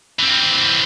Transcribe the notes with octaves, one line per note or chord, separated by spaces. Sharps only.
E3 C4